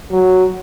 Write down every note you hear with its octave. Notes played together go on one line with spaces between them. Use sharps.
F#3